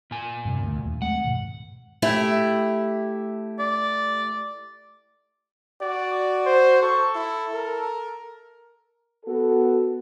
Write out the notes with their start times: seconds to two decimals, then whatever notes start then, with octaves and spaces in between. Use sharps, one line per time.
0.11 A#2 G#5
0.45 G2 C3
0.63 D2
0.85 D#2
1.02 G#3 A3 C4 F#5
1.24 G2 B2 D#3
2.02 A3 E4 G4
3.59 D5
5.81 F#4 D5
6.46 C5
6.82 A4 C#6
7.15 E4
7.53 A#4
9.26 B3 F#4 A4